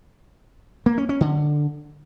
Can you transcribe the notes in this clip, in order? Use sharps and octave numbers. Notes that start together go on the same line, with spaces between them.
A#3
C#4
C#4
D3